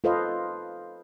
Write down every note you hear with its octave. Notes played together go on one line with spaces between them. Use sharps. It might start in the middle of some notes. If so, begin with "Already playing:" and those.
F4 A4 B4 C5 D#5 F5